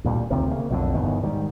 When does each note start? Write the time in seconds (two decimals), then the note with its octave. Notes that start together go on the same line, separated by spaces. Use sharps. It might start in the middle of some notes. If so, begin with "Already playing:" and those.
0.04 D2 A#2 F#3 G3
0.30 D2 C3 D#3 F3
0.50 C#3 A#3
0.70 B1 F2 A2 D3
0.94 G1 E2 B2 D#3
1.23 G#2 D#3 G3